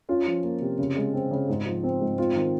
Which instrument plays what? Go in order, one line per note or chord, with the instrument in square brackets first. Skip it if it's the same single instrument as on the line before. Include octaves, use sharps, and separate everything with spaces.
[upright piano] C#4 F4
F3
A#3
C3
C#3
G#3
C4
C#3
G#2
F3
C4
G#2
C4 F4
D#3